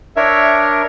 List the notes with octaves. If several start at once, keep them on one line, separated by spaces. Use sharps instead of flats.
D4 A#4 C#5 E5